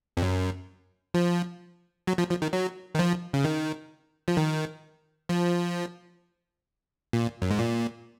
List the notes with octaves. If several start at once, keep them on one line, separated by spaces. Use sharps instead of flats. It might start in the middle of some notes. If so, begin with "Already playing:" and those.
F2
F#2
F3
F#3
F3
F3
D#3
F#3
D#3
F3
C#3
D#3
F3
D#3
F3
A#2
F#2
G#2
A#2